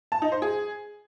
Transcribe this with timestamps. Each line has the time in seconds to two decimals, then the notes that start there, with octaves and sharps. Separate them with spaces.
0.12 A5
0.22 D#4
0.32 C5
0.42 G#4